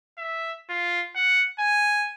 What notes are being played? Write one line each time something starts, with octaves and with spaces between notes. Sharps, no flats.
E5
F4
F#5
G#5